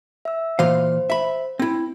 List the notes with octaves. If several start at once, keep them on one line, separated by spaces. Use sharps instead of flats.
E5 E6
A#2 E3 C5 F5
E5 B5
C4 E4